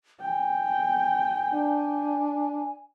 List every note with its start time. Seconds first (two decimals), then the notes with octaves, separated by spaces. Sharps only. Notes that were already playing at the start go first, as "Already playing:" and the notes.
0.21 G5 G#5
1.54 D4